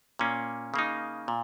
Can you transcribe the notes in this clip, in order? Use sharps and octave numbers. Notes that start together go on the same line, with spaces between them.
A#2 A#3 C#4
C#3 A#3 D#4
A#2